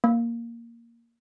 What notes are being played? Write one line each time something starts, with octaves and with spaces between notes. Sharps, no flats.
A#3